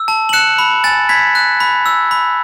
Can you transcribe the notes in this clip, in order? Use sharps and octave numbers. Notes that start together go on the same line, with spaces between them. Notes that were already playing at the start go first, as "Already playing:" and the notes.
Already playing: E6
A5
F#7
F#6 C#7 E7
B5
G#5 A6
B5 G#6 B6
F#6
B5
E6
B5